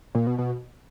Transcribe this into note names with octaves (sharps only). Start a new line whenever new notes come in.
A#2
B2
B2